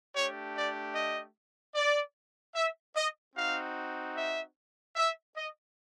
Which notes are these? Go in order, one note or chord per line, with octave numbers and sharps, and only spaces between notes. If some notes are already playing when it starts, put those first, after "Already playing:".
A3 D4 G4 C#5
D5
D#5
D5
E5
D#5
C4 D#4 F#4 F5
E5
E5
D#5